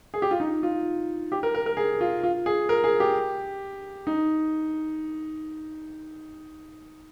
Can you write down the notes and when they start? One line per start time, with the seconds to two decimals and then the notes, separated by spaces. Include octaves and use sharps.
0.14 G#4
0.22 G4
0.31 F4
0.40 D#4
0.63 F4
1.32 G4
1.43 A#4
1.55 A#4
1.66 A#4
1.77 G#4
2.01 F4
2.23 F4
2.46 G#4
2.69 A#4
2.84 G#4
3.00 G4
4.07 D#4